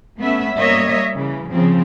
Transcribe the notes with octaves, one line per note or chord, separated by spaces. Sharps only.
A3 B3 C#4 E5
G3 A#3 C#5 D#5 E5
C#3 E3
C#3 F3 C4